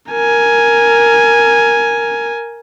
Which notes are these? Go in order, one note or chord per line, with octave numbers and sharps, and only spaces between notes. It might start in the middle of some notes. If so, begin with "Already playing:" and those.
A#4 G#5